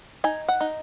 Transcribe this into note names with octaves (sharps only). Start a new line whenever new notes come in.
D#4 G#5
F#5
D#4